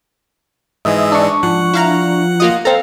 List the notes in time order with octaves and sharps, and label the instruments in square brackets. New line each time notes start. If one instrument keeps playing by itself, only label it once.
[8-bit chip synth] G#2 E3 G#3 [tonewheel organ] D#5 E5
[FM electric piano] D4 C#6
[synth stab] G#2 [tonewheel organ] F3 [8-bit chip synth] F#5
[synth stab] E4 F5 A#5
A#3 F4 D#5
[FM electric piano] C4 A#5 [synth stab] A4 F5